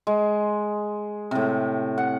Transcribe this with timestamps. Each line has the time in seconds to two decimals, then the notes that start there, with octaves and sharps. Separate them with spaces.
0.07 G#3
1.31 A2 C3
1.98 F#5